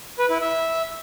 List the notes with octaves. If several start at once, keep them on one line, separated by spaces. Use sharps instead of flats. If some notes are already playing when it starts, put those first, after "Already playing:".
B4
E4
E5